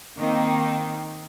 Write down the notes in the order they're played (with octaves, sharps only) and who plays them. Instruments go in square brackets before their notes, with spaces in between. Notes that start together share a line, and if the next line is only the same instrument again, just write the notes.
[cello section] D#3 A#3 C4 D#4